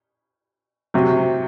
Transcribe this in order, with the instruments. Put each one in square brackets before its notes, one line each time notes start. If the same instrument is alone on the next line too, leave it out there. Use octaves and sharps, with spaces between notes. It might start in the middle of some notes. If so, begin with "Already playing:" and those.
[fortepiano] C3 F#3